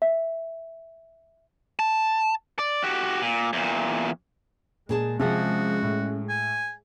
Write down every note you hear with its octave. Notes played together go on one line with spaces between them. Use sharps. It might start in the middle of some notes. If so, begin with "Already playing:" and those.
E5
A5
D5
F#4 G4
A#2
E2 A#2
A#2 G#3 G#4 A5
C3 F3 C#4 F#4 G#4 F#5
A2
G#5